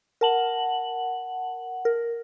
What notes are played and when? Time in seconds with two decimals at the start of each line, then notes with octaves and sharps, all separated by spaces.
0.21 A#4 F#5 A5 F#7
1.85 A#4